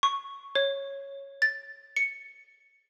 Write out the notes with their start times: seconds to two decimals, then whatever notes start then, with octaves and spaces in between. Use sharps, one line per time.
0.03 C#6
0.55 C#5
1.42 A6
1.96 C#7